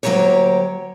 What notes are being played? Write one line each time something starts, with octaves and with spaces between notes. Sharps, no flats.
D2 F#3 G#3 A#3 G4 C#5